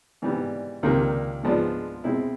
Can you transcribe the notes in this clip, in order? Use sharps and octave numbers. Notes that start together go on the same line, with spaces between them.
G#2 E3 G3 B3
C#2 C3 D#3 G3 A#3
G#2 F3 G#3 B3 D4
B2 G#3 C4 E4